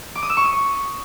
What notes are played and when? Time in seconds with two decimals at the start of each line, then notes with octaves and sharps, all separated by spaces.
0.15 D6
0.23 D#6
0.30 E6
0.37 C#6
0.44 D#6